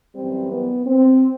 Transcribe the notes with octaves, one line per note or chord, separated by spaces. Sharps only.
F#2 E3 G3 C4
B3
C4